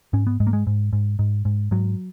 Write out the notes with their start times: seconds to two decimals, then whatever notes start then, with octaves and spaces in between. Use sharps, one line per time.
0.13 G#2 C#4
0.27 B3
0.40 G#2 G#3
0.47 A#3
0.53 G#3
0.67 G#2
0.93 G#2
1.19 G#2
1.45 G#2
1.71 G#2 F#3